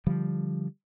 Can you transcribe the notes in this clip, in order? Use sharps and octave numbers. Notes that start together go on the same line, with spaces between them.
D3 F3 G3